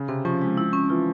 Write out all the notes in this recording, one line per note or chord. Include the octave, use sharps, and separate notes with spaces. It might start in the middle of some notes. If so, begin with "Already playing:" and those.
Already playing: C#3
C3 C4
F3 C#4
G#3
E4
C#4
E3 F4